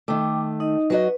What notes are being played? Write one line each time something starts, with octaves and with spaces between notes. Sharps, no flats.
D#3 A3 G5 D6
D#4 D#5
F#3 F#4 B4 D#5